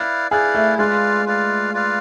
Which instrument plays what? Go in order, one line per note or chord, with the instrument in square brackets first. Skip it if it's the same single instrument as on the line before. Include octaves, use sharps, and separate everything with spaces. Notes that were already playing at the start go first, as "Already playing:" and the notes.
Already playing: [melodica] E4 B4 D5 F5
[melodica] E4 B4 D5 F5 [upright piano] G#4
[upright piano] A3
[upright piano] G#3 [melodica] F4 B4 D5 F5
[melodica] F4 B4 D5 F5
F4 B4 D5 F5